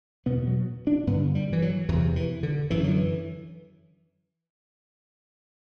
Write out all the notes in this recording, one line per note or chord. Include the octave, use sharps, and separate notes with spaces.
E2 B2 B3
F#3
D4
G2 D3 B3
G3
E3
F#3
E2 C3 E3
E3
D3
F#2 D3 E3
F#3
E3